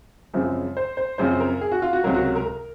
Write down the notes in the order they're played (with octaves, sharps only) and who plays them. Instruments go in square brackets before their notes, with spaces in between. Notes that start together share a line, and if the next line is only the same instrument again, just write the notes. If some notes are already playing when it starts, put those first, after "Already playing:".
[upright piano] F#2 C#3 F3 G#3 C4
C5
C5
F#2 C#3 F3 C4 C5
A#4
G#4
F#4
F4
F#4
C#2 C3 F#3 A#4
F#4
A#4
A#4
A#4